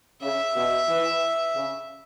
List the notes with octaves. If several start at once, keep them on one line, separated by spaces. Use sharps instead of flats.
C#3 E5
B2
E3
C#3